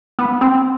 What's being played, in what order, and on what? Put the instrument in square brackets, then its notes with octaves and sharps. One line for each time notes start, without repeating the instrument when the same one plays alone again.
[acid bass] B3
C4